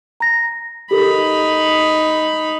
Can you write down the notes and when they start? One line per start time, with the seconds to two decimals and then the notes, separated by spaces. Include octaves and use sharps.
0.20 A#5 A#6
0.91 D#4 G4 A4 A#4 B5